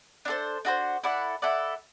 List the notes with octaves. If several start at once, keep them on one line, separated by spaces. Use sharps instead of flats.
D4 F#4 A4 C5
D4 F#4 A4 C5
E4 A4 D5 F#5
E4 A4 D5 F#5